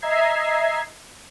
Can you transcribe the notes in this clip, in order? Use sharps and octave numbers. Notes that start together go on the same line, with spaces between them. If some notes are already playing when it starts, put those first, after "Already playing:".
D#5 E5 A#5 G#6 C7